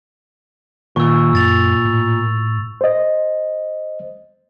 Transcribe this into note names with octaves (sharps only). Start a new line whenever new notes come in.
A#2 D#3 C#6 E6
F#2 E6 A6 F7
A2
C5 D#5